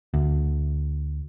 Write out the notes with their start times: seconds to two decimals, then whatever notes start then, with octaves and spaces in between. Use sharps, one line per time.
0.14 D2